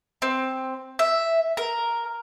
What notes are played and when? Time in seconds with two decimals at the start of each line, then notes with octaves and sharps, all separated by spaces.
0.22 C4
0.99 E5
1.57 A#4